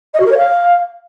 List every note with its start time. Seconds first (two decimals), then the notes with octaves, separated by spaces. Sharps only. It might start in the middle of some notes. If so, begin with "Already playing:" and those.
0.14 D#5
0.19 F#4
0.25 A#4
0.31 C#5
0.37 F5